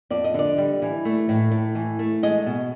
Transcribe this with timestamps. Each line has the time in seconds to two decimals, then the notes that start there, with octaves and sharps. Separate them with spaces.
0.10 F2 D5
0.24 D#5
0.34 D3 D5
0.58 G3
0.82 E3
1.05 A3
1.29 A2
1.52 A2
1.75 E3
1.99 A3
2.23 G#3 D#5
2.46 B2